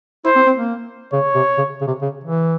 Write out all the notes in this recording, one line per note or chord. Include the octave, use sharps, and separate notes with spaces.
E4 C5
C4
C4
A#3
C#3 C#5
C3
C#3
C#3
C3
C#3
E3